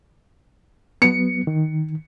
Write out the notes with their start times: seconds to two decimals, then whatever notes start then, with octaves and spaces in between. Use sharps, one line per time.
1.02 F#3 B3 C#7
1.47 D#3